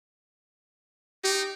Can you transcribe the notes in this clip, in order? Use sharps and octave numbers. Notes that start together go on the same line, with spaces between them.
D#4 G4